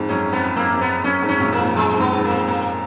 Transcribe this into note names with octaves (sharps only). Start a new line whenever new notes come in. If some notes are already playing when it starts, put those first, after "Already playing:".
Already playing: F2 G#2
F#2 C#4
F2 B3
F#2 A#3
F#2
F2 B3
F#2 C#4
F2 G#2
C#4
F#2 A#2
A#3
F2 G#2
F#2 G#3
F2 G#2
B3
F2 G#2
A#3
F2
A#3